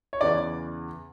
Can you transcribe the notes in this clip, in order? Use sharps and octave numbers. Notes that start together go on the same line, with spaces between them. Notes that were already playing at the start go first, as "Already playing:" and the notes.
C#5
E2 C#3 E3 D5